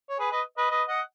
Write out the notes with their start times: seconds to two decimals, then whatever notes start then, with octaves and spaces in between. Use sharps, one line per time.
0.09 C#5
0.19 G#4 B4
0.32 B4 D#5
0.57 B4 D#5
0.70 B4 D#5
0.88 D#5 F#5